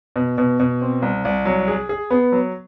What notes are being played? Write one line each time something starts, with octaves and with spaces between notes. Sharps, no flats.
B2
B2
B2
C4
C2
C2
F#3
G#4
G#4
B3
F#3